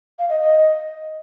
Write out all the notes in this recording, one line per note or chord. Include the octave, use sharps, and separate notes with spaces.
F5
D#5
D#5